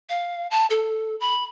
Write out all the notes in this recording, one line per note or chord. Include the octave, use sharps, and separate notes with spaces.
F5
A5
A4
B5